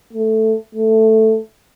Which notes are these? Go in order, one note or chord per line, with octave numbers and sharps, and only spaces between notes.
A3
A3